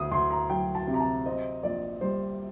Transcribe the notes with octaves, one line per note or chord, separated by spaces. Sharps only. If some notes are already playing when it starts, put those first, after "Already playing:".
Already playing: D2 D#6
D2 C6
A#5
F#3 G5
A5
C3
A#5
A5
C4 D#5
A#1 D5
G3 C5